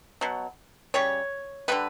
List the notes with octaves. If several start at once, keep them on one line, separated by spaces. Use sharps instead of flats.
B2 F#3
C#3 G3 C#5
D3 G3 B3 B4